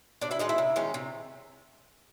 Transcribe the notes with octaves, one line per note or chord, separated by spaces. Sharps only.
C3 D4 D5
E4 E5
D#3 G#3 D#4 D#5
E4 E5
C3
D#3 G#3 C#4
C3